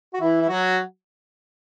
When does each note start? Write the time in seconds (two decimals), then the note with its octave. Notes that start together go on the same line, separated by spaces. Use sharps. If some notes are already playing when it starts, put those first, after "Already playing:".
0.14 F#4
0.21 E3 E4
0.41 E4
0.49 F#3 F#4